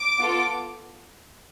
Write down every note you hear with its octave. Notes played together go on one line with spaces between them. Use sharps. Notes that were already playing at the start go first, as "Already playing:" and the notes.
Already playing: D6
B3 F4 A4